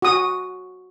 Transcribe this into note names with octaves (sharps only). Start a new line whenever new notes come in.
F#4 D#6